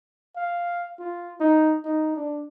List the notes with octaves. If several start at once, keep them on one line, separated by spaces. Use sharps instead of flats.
F5
F4
D#4
D#4
D4